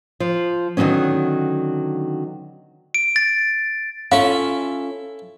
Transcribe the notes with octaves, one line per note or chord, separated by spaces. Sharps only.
F3
D3 D#3 F#3 B3 C#4
D7
A6
C#4 E4 F4 A4 F5